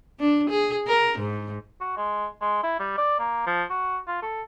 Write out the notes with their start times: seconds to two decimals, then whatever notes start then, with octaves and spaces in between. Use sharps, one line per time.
0.20 D4
0.49 G#4
0.87 A#4
1.19 G#2
1.81 F#4
1.97 G#3
2.42 G#3
2.63 E4
2.80 G3
2.98 D5
3.19 A#3
3.47 F3
3.70 F#4
4.07 F4
4.22 A4